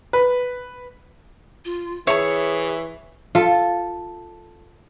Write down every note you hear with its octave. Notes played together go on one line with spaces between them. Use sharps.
B4
F4
E3 G#4 C#5 E5 C#6
F4 A4